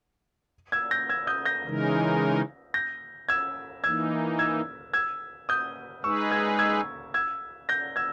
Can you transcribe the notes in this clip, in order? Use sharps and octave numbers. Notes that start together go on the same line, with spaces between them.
E6 G#6
G6 A#6
E6 G#6
D#6 G6
G6 A#6
C#3 E3 G#3 D#4 A#4
G6 A#6
E6 G#6
E3 A#3 D#4 E6 G#6
E6 G#6
E6 G#6
D#6 G6
G#3 D#4 G#4 B4 C#6 E6
E6 G#6
E6 G#6
E6 G#6
G6 A#6
E6 G#6